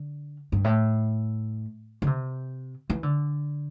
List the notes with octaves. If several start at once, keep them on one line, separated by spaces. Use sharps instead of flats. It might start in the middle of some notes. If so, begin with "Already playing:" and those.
Already playing: D3
G2
A2
D3
C3
E3
D3